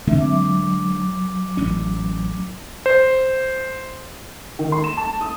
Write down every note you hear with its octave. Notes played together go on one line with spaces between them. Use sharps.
D3 G#3 A3 C4 E5
F#3 D6
A1 C#4
C5
D#3
C6
E7
A5
D#6